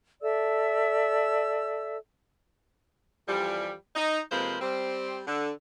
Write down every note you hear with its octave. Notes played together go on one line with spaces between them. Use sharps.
A4 D5 E5 E6
F2 E3 F3 G3
D#4
C3 F3 G#3 A#3 B4 C5
G3 C4
D3